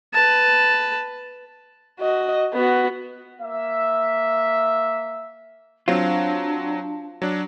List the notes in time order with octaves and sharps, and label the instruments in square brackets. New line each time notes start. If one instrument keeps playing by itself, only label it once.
[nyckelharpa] B4 A5
[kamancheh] F#4 D#5
B3 F#4
[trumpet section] A#3 E5
[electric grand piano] F#3 C4 [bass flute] D4 [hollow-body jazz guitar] F4
[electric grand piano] F#3 D4